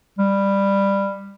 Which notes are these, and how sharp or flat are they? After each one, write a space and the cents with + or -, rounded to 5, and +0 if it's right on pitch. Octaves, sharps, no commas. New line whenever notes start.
G3 +15